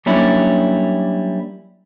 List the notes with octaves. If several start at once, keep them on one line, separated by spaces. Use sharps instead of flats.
F#3 G3 A#3 C#4 D4 E4